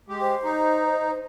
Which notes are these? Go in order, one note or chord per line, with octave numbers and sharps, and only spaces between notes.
G#3 G4
C5
D#4